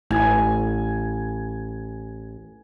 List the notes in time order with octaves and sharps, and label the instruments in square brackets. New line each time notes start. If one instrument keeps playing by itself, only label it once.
[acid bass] A1 [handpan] A3 E4 [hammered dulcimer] G#5